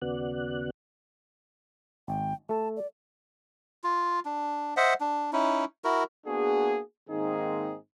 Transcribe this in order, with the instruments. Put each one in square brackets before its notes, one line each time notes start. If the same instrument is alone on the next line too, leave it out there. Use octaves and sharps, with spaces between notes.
[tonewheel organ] D#2 C#3 B3 F#4 D5 F#6
[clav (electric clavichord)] G#1 [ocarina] G5
[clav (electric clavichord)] A3 A4 [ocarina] A5
[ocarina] D5
[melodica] F4
D4
C5 D#5 E5 F#5
D4
C#4 D#4 E4
E4 F#4 A#4
[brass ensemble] A#3 B3 D4 F#4 G#4
G#2 D#3 A#3 C4 D#4 G#4